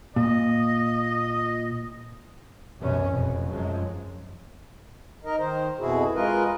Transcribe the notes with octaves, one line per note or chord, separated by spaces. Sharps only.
A#2 D#5
C2 F#2 B2 E3 C#4
F1 F2 B2
F#2 F3 F#3 G#3
D#4 A#4 D#5
D#3 C5
F2 B2 E4 F#4 G#4
G#3 F4 A#4 B4 D#5